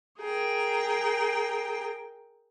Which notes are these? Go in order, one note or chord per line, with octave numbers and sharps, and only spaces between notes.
G#4 A#4 G5